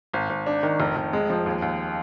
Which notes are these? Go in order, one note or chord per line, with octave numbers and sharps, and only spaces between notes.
G#1
G#1
D4
D#3
F1
F1
G#3
F3
D#2
D#2